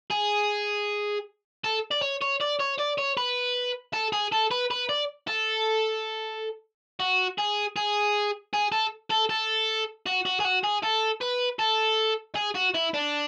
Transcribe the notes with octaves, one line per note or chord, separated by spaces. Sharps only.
G#4
A4
D5
C#5
C#5
D5
C#5
D5
C#5
B4
A4
G#4
A4
B4
B4
D5
A4
F#4
G#4
G#4
G#4
A4
A4
A4
F#4
F#4
G#4
F#4
G#4
A4
B4
A4
G#4
F#4
E4
D4